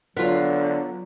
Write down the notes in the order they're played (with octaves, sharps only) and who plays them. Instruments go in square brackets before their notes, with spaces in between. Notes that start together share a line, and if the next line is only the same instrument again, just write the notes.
[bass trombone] D3 [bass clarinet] F#3 [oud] B3 F4